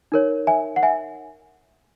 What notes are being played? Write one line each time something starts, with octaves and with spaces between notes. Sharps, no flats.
D#4 A#4 C#5
E5 G#5
F#5
E5 G#5